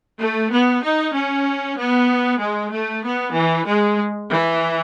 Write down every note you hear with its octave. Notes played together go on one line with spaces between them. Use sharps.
A3
B3
D#4
C#4
B3
G#3
A3
B3
E3
G#3
E3